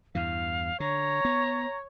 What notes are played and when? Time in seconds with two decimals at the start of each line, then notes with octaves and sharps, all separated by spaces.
0.15 E2 G2 E3 F5
0.80 D3 C#5 A#5
1.25 B3